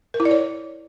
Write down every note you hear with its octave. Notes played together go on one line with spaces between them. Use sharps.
A#4
E4
D5
C#5